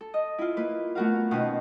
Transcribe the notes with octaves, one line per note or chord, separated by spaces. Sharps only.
A4
D#5
E4 F4
A#3 B4
A3 B3 F#4 A#4 F5
B2 D#3 A#3 C#4 B4